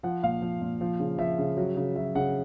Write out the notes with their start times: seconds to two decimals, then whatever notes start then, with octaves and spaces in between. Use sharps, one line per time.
0.03 F3 F#5
0.23 A#2 F5
0.42 F3
0.61 A#2
0.81 F3
1.00 C#3
1.18 F3 E5
1.39 C#3
1.57 F#3
1.76 C#3
1.96 F#3 E5
2.15 C#3 F#5